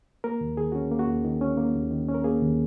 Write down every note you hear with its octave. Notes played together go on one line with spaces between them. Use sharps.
A#3 A#4
D#2
D#3 G#4
C#4 F#4
A#3
F#4
D#2
D#3
C#4
A#3
D#2
D#3
C#4
A#4
A#3 G#4
D#2